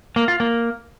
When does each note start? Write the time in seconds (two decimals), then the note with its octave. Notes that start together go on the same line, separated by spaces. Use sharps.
0.16 A#3
0.28 F4
0.40 A#3